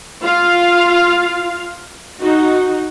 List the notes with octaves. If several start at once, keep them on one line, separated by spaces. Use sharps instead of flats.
F4 F5
D#4 F#4